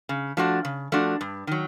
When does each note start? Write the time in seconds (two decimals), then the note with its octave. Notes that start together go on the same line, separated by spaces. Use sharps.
0.09 C#3
0.37 F3 A3 D4 F#4
0.65 C#3
0.92 F3 A3 D4 F#4
1.21 G2
1.47 D#3 F#3